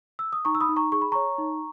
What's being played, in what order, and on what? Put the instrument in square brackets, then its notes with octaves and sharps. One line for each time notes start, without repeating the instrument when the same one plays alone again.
[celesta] E6
D#6
D#4 A#5 C#6
E6
B5 D#6
D#4
A#5 C#6
G#4 C#6
B5
C#5 A#5 C#6
D#4